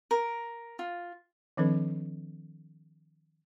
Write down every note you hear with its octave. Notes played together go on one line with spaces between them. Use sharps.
A#4
F4
D#3 F3 C4 D4 A4 B4